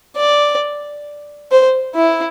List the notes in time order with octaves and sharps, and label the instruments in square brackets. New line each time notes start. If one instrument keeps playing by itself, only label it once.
[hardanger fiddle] D5
C5
E4